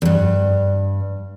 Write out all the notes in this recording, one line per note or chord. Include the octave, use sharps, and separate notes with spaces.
E2 G2